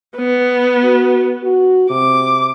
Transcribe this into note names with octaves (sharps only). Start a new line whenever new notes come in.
B3
F#4
F#4
C3 D6